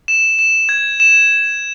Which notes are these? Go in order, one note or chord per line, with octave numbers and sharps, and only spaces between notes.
E7
E7
G#6
E7